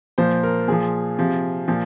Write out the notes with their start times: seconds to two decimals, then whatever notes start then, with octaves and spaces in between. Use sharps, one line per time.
0.18 A#2 F3 C5
0.43 A#4
0.68 A#2 F3 G#4
1.18 C3 F3
1.68 A#2 F3